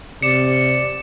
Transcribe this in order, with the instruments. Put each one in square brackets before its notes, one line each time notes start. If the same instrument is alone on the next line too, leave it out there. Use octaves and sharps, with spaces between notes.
[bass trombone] C3 [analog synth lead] D5 [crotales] C#7 E7